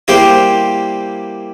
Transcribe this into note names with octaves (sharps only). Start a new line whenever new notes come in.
G3 A#3 E4 G4 C5